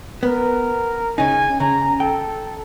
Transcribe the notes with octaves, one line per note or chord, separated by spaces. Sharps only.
B3 A#4
C#3 D#4 G#5
C#3 A#5
A4 G5